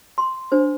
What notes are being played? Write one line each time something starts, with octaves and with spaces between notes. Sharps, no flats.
C6
D4 C5